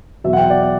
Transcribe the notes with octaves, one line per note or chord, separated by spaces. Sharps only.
E2 B2 F#3 E5
F#5
G5
D5
D5